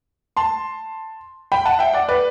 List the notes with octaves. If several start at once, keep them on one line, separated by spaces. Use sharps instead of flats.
A5 C6
G5 B5
F#5 A5
E5 G5
D5 F#5
B4 D5